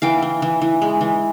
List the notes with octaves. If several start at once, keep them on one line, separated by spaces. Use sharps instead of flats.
E3 F5 G5
E3
E3
E3
G#3
E3